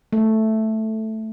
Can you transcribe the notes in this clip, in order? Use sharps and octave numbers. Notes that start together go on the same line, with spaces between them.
A3